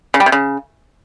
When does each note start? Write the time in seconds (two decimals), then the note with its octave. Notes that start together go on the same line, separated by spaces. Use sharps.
0.14 C#3
0.20 G3
0.26 C3
0.32 C#3